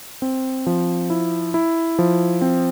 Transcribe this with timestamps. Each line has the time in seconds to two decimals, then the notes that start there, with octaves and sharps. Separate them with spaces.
0.22 C4
0.67 F3
1.10 E4
1.54 E4
1.99 F3
2.42 C4